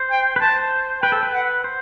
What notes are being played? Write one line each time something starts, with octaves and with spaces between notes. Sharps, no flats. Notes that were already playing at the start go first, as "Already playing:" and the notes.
Already playing: C5
G5
B4
C5 A5
B4 G5
A4
B4
F#5
C5